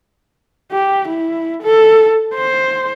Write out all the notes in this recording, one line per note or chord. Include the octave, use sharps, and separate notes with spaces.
G4
E4
A4
C5